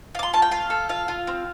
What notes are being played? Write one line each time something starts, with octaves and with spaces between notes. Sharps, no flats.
F4 D6
C6
A3 A5
G5
F4 F5
A4
F4 F5
F4
C4